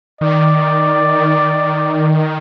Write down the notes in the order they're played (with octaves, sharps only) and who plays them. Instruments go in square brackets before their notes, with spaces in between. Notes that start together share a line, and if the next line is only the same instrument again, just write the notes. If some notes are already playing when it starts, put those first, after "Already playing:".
[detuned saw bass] D#3 [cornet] D5